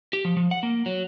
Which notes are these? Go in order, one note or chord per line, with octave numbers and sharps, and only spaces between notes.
G4
F3
F3
F#5
A#3
F#3